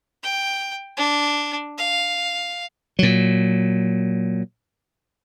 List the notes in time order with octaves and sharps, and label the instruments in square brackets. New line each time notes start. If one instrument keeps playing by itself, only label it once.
[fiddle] G5
D4
F5
[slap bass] A#2 F#3